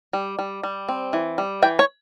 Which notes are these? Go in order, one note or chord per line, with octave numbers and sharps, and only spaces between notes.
G3
G3
G3
C4
E3
G3
E3 G5
C#5